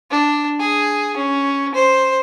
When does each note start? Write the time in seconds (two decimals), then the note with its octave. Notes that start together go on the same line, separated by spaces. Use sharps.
0.10 D4
0.59 G#4
1.17 C#4
1.74 C5